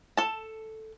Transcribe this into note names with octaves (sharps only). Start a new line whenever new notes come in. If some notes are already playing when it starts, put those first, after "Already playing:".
A4 A5